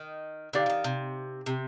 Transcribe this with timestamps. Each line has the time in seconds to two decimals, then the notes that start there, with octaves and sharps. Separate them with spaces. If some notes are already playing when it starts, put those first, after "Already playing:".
Already playing: D#3
0.53 D3 D#4 G4 D5 F5
0.66 F3
0.70 D#3
0.84 C3
1.46 C3